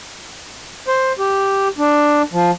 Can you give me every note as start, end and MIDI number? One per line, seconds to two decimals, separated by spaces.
0.88 1.12 72
1.19 1.68 67
1.78 2.22 62
2.33 2.51 53